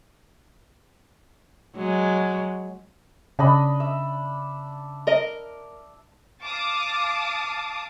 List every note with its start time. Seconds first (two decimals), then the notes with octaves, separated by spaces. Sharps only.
1.76 F#3 G#3
3.39 C#3 D4 D#5 B5
3.80 E5
5.07 A#4 D#5
6.43 F5 A5 D6 D#6